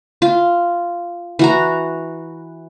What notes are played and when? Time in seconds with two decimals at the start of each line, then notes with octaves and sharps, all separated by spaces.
0.22 F4
1.39 E3 F#4 A#5